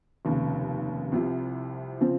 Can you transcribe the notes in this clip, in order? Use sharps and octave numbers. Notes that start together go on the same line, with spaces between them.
F1 D#2 C#3
C2 C3 F3
C#3 F3 C4 F4